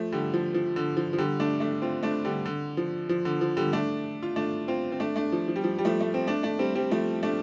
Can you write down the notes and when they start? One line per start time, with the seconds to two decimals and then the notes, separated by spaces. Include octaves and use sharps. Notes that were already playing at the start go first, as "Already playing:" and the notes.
Already playing: F3 A3
0.12 D3 G3
0.34 F3
0.54 F3
0.76 D3
0.97 F3
1.13 F3
1.18 D3 G3
1.40 A3 D4
1.60 A3 D4
1.82 C4 F4
2.03 A3 D4
2.25 D3 G3
2.45 D3
2.77 F3
3.09 F3
3.25 D3
3.41 F3
3.57 D3 G3
3.73 A3 D4
4.23 F4
4.36 A3 D4
4.68 C4 F4
4.92 C4
5.00 A3 D4
5.16 A3 D4
5.32 F3
5.48 F3
5.56 G3
5.64 F3
5.78 G3
5.85 F3 A3
6.01 A3
6.14 C4
6.27 A3 D4
6.43 A3 D4
6.59 G3 C4
6.75 G3 C4
6.91 F3 A3
7.23 A3 D4